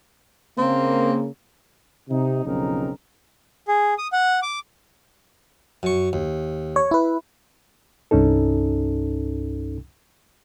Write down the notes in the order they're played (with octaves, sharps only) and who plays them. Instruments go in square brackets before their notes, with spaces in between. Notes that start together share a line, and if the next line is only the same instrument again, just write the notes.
[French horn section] C#3 A#3 [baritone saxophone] C4
[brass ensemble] C3 D#4
B1 F2 C#3 C4 D#4 A#4
[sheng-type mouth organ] G#4
D#6
F#5
D6
[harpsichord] F#2 C#6
D#2
[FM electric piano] C#5
E4 B4
[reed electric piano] C2 G2 C#4 D#4 A4